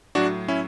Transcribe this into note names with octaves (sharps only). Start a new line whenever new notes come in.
A2 F#3 D4 F#4
C#4 E4